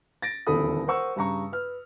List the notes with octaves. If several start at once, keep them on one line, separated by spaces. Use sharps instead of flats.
A6 A#6 D7
D#1 E2 D3 A4 B5 D#6
A#4 C5 F#5 C#6 E6
G2 C#3 A#5 C#6
B4 F6